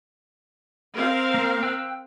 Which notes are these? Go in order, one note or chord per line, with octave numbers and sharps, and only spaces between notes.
C4 A#4 F5
A#3
G5 E6 F#6